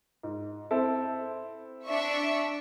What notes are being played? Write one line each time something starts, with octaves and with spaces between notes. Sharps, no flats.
G#2
C4 E4 A4
D4 E5 C#6